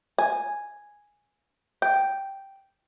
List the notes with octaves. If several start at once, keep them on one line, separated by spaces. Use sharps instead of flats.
G#5
G5